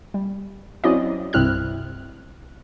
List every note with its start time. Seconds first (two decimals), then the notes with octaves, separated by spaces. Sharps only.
0.14 G3
0.84 F#3 C4 C#4 E4 D5 D#5
1.33 C2 G2 C4 E4 F6 F#6